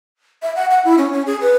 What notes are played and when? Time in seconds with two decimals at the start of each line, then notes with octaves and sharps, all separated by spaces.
0.42 E5
0.56 F#5
0.71 F#5
0.85 E4
0.98 C#4
1.12 C#4
1.26 G#4
1.41 B4